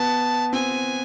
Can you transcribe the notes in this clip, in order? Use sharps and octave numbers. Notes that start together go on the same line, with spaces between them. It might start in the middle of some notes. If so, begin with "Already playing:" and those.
Already playing: B3 A5
C4 G#5